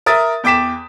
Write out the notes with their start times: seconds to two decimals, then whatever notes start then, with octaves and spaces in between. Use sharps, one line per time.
0.06 A#4 E5 D#6 A6
0.43 E2 G5 D6 B6 E7